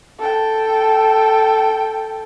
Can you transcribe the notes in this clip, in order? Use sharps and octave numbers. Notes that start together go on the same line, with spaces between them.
A4 G5